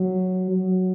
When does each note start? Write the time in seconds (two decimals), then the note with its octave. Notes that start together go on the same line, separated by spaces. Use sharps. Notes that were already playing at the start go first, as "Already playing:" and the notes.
Already playing: F#3
0.52 F#3